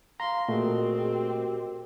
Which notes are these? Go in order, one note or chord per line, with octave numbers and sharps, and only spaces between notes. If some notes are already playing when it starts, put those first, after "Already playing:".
F5 A#5 C6
A#2 A3 C4 F#4 G#4 A#4 D#5
G4